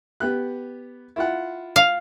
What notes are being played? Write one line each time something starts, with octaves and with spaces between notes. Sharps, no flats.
B3 G4 F#6
E4 F4 F#5
F5